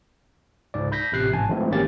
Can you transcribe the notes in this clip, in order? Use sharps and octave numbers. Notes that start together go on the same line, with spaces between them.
C#2 G#2 D5
B5 G6 A#6 B6
A1 C3 F#6 C7
A1 G#2 G#5 A5
E3 F3 G#3 A3 C4
A1 D#3 A#3 C#4 G4 A6